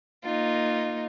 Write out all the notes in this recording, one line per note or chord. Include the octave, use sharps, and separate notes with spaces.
A#3 D#4 F4